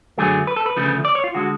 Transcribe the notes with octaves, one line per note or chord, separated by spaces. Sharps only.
F#2 D3 F#3 A3 G#4
B4
A4
B4
D2 C#3 F3 A3
D5
C#5
F4
D3 G#3 F#4